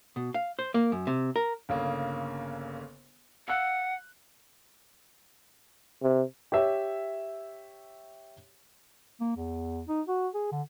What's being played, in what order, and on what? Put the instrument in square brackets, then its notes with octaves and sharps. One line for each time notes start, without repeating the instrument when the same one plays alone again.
[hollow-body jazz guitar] B2
F5
C5
A#3
F#2
C3
A#4
[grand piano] G1 C#3 A#3
[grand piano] F5 E6 F#6 [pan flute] F#5
[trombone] C3
[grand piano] G4 C#5 E5
[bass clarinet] A#3
E2
D#4
F#4
G#4
D3